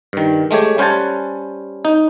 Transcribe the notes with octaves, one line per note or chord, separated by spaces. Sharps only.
G2 D#3
G#3 A3 G4 C#5
G3 C#4 C5 F#5 G#5 A5
D#4